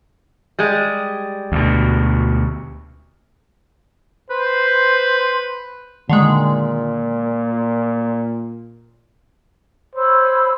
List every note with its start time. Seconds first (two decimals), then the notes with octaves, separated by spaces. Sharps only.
0.59 G3 G#3
1.52 D2 B2
4.30 B4 C5
6.09 A#2 D3 D#3 G#3
9.95 C5 C#5 B5 E6